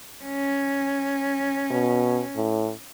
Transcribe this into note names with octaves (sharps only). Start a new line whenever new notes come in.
C#4
B2
A2